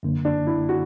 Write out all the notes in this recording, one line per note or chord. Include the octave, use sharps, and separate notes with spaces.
F#2 D3 A#3
D4
E4
F#4